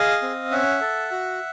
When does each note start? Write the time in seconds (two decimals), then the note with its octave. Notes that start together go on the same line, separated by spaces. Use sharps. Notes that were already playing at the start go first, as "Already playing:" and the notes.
Already playing: G#4 D#5 F5
0.22 C4
0.51 C#4 E5 F#5
0.81 A4
1.11 F#4